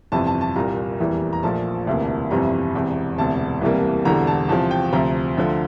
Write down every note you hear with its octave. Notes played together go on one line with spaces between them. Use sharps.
G1 F2 C3 E3 A5
A5
A5
C2 A#2 G3 A#3 A#5
F1 E2 E3 G3 A#3
A#5
A#1 A#2 F3 A3 A5
E1 D2 C3 E3 A#3
G1 F2 C3 E3 G3 A#5
E1 E2 C3
E1 D2 C3 A5
C2 C3 E3 G3 A#3
E1 E2 D3 G3 A#5
A5
E2 C3 F3 A5
G5
D2 C3 F3 A#5
D2 D3 F3